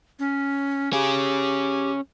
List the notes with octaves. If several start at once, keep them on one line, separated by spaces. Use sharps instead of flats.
C#4
C#4 G4 G#4